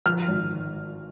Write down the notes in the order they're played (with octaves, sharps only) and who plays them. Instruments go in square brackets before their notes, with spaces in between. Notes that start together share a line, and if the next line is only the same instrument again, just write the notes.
[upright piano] F3 F6
G#1